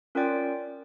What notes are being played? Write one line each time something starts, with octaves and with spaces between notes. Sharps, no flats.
C#4 F4 A#4 D5 G5